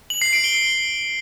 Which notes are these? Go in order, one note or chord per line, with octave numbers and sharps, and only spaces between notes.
F#7
C7
D7
G7